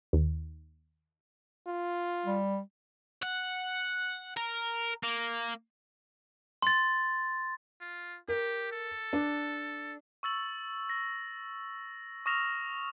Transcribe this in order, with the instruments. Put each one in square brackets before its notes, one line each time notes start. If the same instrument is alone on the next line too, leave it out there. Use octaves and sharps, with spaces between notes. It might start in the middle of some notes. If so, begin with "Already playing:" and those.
[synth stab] D#2
[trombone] F4
[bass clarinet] G3
[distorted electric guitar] F#5
A#4
A#3
[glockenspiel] C6 A6
[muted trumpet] F4
[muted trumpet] G4 [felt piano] A#4
[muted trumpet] A4
[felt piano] D4
[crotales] C#6 E6 A6 F#7
A#6
C#6 D#6 F6 A#6 E7 F7